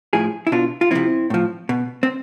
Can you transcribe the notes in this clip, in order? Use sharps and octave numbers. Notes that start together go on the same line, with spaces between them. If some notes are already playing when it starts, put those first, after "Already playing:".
A2 F3 E4 G#4
E4
B2 D4 F4
F4
C3 F3 C4 E4
A2 F3
B2
C4